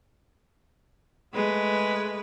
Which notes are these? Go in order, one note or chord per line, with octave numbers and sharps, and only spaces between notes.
G#3 A3 B4